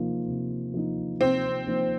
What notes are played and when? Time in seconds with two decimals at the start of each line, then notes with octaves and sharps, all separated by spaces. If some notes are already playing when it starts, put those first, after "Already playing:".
Already playing: C3 F3 A#3 D#4
0.28 C3
0.74 F3 A#3 D#4
1.21 C3 C4
1.67 F3 A#3 D#4